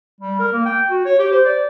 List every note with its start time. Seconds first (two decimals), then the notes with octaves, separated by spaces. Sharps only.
0.21 G3
0.39 A#4
0.53 A#3
0.65 G5
0.90 F#4
1.05 C#5
1.19 G4
1.31 C5
1.45 D5